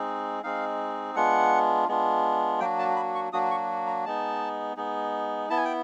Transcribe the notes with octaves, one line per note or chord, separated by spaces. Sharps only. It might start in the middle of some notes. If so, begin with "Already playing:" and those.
Already playing: G#3 C4 D#4
G#3 C4 D#4 F5
G#3 B3 D4 F4 F#5
G#3 B3 D4 F4
F#3 A#3 D4 F#4 G5
A5
B5
C#6
F#3 A#3 D4 F#4 D#6
C#6
A#5
G#3 B3 D#4 A5
G#3 B3 D#4
B3 E4 A5
G#5
G5